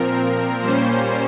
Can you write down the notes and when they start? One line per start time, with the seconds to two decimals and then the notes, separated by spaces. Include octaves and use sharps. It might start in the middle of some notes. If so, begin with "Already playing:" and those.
Already playing: A#2 F3 C4 A#4
0.62 A#2 G3 A#3 C#4 C5